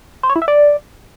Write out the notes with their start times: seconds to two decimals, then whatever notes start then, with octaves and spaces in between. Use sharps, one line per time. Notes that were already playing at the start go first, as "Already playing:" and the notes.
0.23 C5
0.29 C#5
0.36 E4
0.42 E5
0.48 D5